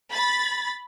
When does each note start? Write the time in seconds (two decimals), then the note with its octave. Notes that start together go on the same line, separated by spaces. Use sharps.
0.11 B5 A6